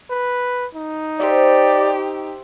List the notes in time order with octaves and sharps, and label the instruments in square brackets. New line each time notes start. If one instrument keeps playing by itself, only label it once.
[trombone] B4
D#4
[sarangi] G4 [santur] C5 E5 [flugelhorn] D5